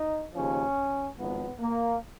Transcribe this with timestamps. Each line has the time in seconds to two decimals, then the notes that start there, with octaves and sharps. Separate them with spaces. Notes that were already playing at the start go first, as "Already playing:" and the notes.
Already playing: D#4
0.34 D#2 C#3 F3 C#4
1.17 G#1 G#2 F3 B3
1.59 A#3